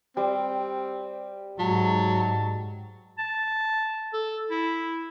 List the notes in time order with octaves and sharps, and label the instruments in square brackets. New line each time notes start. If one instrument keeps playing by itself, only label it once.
[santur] G3 [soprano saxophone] C4
[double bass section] G#2 [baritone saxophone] F#3 [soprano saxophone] A5
[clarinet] A5
A4
E4